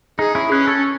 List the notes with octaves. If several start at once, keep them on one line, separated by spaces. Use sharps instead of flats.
D#4 G#4
C#4 E4
C#4 G#4 B4
A4 C#5